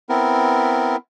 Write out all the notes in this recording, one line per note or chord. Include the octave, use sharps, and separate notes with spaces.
B3 C4 E4 A#4